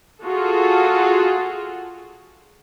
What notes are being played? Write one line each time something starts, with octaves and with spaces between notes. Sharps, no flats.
F4 F#4 G#4 A4